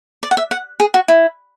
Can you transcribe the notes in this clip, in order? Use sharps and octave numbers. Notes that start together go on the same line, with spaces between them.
D5
F#5
E5
F#5
G#4
F#4
E4